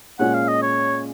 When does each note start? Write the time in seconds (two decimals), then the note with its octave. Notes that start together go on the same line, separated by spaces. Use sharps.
0.19 A#2 G#3 C#4 F#5
0.34 F5
0.48 D#5
0.62 C#5